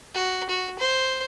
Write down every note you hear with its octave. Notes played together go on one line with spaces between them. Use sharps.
F#4
F#4
C5